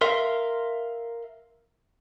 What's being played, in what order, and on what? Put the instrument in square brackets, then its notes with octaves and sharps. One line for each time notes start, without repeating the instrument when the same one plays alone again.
[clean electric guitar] A#4 E5 F5 C6